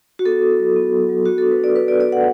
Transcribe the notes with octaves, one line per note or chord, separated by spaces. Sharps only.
F#4
B3 A4
E4
F#3
B3
F#3
F#3
B3 F#4
D4 A4
B4
D4 D5
B3 B4
D5
B3
D5
F#4 F#5